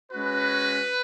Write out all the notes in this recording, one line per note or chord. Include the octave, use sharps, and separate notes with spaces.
G#3 C#4 F#4 B4